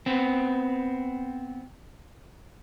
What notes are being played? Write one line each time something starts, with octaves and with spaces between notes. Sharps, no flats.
B3 C4